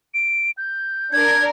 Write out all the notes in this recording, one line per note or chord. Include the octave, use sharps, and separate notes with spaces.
D7
G6
D4 A#4 G#6